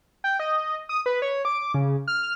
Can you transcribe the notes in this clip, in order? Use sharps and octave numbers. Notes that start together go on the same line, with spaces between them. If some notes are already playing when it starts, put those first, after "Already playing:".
G5
D#5
D#6
B4
C#5
D6
C#3
F6